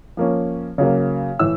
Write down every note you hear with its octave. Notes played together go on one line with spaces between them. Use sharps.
F3 A#3 C#4
C#3 F#3 A#3
A2 E3 E6